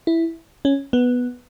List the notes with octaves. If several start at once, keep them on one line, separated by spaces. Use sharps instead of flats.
E4
C#4
B3